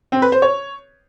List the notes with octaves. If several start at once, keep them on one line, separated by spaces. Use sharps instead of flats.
C4
B4
C5
C#5